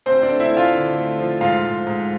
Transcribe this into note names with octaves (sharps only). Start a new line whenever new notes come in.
D2 C4 C5
D4 D5
A3
E4 E5
A3
F4 F5
D3
A3
F3
G#2 F4 F5
G#2
G#2